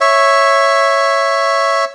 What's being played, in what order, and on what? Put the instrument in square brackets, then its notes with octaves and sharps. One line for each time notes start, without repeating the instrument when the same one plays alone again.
[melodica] C#5 E5